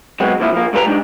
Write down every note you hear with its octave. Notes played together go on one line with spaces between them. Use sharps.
F#3 G#3 B3 C4
F2 A#2 F3 E4
F3 A#3
A2 G3 F4 A#4 B4 A#5
G3 G#3 C4 D4 D#4